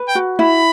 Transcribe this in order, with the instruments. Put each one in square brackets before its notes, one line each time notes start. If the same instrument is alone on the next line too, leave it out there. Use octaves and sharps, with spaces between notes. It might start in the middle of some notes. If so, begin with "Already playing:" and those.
Already playing: [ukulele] B4
[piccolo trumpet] G5
[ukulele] F#4
[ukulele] E4 [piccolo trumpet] B5